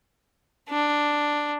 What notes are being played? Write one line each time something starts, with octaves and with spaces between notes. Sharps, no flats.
D4